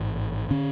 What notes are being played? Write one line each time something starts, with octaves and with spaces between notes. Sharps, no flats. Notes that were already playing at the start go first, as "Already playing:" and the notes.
Already playing: A1 G#2
D3 C#4